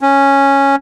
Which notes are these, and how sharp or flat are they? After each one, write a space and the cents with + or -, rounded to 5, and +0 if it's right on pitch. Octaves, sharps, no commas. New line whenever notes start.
C#4 -5